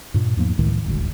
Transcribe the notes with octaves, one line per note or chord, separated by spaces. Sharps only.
G2 A#2
E2 G#2 F3 A#3
C#2 A2 D#3
D#1 G#1 D2